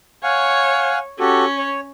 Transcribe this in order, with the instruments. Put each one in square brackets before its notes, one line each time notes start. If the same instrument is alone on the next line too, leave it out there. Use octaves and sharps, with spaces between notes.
[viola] C#5 [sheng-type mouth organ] F5 F#5 G#5
[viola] C#4 [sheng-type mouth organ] F#4 G4 A4
[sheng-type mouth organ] C#5